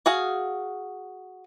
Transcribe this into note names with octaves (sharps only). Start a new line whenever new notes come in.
F#4 G#4 F5